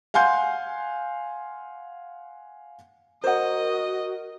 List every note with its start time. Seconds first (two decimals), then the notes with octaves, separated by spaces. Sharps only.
0.14 F5 F#5 G#5 C6 G6
3.24 F#4 A#4 C5 D#5 F#5